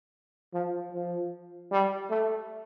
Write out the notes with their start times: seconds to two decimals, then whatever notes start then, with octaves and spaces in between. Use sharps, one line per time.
0.54 F3
0.92 F3
1.71 G3
2.10 A3